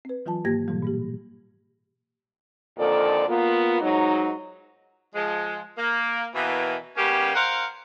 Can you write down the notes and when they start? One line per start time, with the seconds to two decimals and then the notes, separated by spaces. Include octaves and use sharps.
0.05 C4 B4
0.26 E3 F#3 F4 G#5 A5
0.45 G#2 D#3 A#3 G4 G#6 A#6
0.68 G#2 B2 E3 F#3 G3
0.82 A#2 A#3 G4
2.79 F2 A#2 D3 D#3 A4 D5
3.29 A#3 B3 F4
3.81 G#2 F#3 D#4
5.15 F3 G#3
5.78 A#3
6.35 B2 E3 A#3
6.97 C#3 G3 A#3 B3 C#4 G4
7.35 A#4 C5 F5 F#5